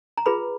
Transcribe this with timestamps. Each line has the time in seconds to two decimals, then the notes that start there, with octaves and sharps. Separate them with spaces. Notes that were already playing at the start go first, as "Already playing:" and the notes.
0.17 A#5
0.26 F4 G#4 B4 B5